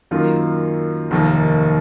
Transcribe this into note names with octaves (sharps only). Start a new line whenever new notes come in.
F#2 D#3 A#3 F4
F1 D#2 D#3 A#3